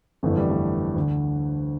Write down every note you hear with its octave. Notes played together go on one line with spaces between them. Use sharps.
G1 F2 E3 A3
G3
A3
D2 D3